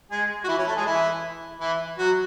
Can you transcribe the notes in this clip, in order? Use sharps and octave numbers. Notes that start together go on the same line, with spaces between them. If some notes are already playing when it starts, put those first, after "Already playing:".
G#3 G#4
F#4
E3 E4
C#4
A3 A4
G#3 G#4
E3 E4
E3 E4
F#3 F#4